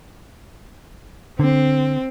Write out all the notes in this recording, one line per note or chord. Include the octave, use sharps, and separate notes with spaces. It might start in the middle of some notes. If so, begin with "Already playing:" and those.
D3 C4